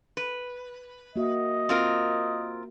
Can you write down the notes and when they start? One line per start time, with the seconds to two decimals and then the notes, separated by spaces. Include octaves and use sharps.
0.17 B4
1.16 A#3 F#4 D#5 E5
1.69 C4 F4 A#4